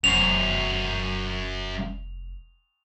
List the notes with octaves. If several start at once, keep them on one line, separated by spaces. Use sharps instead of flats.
F1 F#2 C5 F7